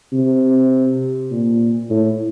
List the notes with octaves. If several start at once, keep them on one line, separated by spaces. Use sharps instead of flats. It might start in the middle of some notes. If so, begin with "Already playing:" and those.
C3
A#2
A2